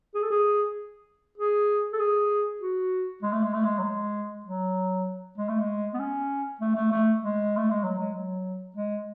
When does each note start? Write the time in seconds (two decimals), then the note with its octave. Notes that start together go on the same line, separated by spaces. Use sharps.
0.15 G#4
0.23 A4
0.30 G#4
1.38 G#4
1.93 A4
1.99 G#4
2.61 F#4
3.22 G#3
3.33 A3
3.43 G#3
3.54 A3
3.64 G#3
3.79 F#3
3.84 G#3
4.46 F#3
5.38 G#3
5.49 A3
5.60 G#3
5.94 B3
6.00 C#4
6.61 A3
6.76 A3
6.91 A3
7.22 G#3
7.57 A3
7.70 G#3
7.84 F#3
7.99 G#3
8.14 F#3
8.76 G#3